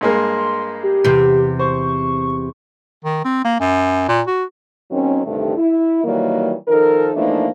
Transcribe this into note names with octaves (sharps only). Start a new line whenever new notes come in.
G2 G#3 A#3 C6
G4
E2 C3
C5 C#6
D#3
C4
A#3
F#2
A#2
F#4
D#2 D#3 F#3 C4 C#4
D2 G2 C3 D#3 A3
E4
D#3 E3 F#3 G3 A#3
D#3 F3 D#4 A4 A#4
E3 F3 A3 A#3 D4 D#4